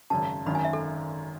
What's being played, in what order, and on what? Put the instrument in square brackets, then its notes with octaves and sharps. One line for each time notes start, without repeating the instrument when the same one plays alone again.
[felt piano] G#1 F#2 C#3 [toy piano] A5
[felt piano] G#1 F#2 D#3 [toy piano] B5
[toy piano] G#5
E5
A4